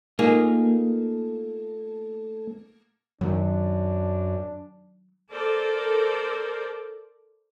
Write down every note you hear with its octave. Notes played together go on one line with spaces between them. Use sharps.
A3 A#3 D#4 F4 G#4
F#2 D#3 F#3 D4
A4 A#4 C5 D5